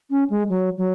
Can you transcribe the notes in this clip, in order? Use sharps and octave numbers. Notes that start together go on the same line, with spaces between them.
C#4
G#3
F#3
F#3